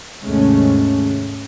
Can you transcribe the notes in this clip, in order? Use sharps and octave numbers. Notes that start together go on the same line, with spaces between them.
D#2 G#2 C3 G#3 A3 C#4